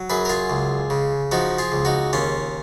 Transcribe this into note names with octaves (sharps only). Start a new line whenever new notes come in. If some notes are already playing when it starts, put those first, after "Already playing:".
Already playing: F#3
F#2 G#4 B4
A#4
F4 G#4
C#2
C#3
F3 D#4 F#4
F4 G#4
C#2
D#4 F#4
D#2 C#4 F4